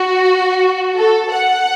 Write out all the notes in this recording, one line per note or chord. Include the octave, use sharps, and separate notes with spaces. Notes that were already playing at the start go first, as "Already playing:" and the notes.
Already playing: F#4
A4
F#5